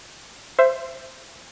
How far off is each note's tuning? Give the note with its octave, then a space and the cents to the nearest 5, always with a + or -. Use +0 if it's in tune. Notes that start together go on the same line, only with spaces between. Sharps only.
C5 +0 E5 +25